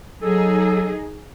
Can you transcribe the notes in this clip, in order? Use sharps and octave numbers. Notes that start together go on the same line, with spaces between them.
F#3 D#4 G#4 A4